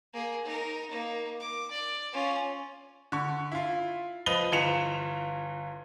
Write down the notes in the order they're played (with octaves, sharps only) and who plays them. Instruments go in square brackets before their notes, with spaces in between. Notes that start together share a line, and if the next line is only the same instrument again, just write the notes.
[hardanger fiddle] A#3 G#4
D#4 A#4
A#3 D#4
D6
D5
C#4 F4
[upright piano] D3 C#6
E4 F4
F3 B4 D#5 B5 F7 G7
G1 E3 F4 C#7 E7 F7